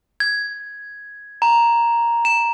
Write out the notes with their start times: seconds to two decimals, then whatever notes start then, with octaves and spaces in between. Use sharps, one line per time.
0.20 G#6
1.42 A#5
2.25 E7